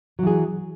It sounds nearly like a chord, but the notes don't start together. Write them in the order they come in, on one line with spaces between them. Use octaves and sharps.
F#3 E3 G#4